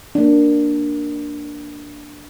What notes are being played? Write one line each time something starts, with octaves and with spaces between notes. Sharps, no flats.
A#3 D4